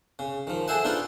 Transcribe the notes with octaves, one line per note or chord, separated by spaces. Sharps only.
C#3
D#3 F3
G#4 A4 C5 E5 F#5
D4 D#4 F4 B4 D5